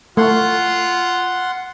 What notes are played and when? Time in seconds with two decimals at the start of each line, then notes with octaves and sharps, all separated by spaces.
0.17 A3 F4 F#5 C6